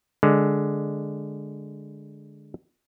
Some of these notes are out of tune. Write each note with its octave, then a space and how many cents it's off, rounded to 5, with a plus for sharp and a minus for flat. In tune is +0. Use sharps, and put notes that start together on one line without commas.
D3 +0 G#3 +0